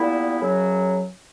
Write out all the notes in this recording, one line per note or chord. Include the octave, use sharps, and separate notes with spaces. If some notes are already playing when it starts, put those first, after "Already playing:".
Already playing: A#2 G3 B3 E4
F#2 C#3 F#3